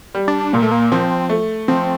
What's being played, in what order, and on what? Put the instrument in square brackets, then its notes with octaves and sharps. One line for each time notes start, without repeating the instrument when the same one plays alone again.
[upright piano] G3
[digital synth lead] D4
[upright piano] A#2 [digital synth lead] A#3
[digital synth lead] A3
A#3
[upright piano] F3 [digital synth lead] C4
[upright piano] A3
[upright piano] F3 [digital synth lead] C4